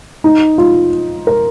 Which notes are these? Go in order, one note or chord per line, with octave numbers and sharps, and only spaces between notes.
D#4
F4
A#4